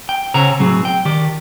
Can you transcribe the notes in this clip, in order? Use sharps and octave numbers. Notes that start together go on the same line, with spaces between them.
G5
C#3 C5 C#5 F#5 A#5
A2 F#3 C4 G#4
G5
D#3 G4 D5